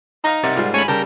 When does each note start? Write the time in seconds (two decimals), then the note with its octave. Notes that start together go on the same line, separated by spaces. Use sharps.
0.24 D#4 F5 A#5
0.44 C3 A#4 D5 F#5
0.56 G#2 G3 F4
0.74 A3 C#4 C#5 G#5 B5
0.88 C#3 G3 G4 A#4 G5 A5